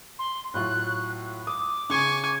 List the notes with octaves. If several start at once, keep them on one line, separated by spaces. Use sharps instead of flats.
C6
A2 F#3 F4 F#6
D6 D#6
C#3 G#5 C#6